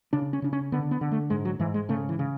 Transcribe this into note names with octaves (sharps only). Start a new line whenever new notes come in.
C#3 D4
C#4
C#3 D4
C#4
D3 B3
B3
D3
A3
G#2 G#3
F#3
G#2 E3
G#3
C#3 A3
E3
C#3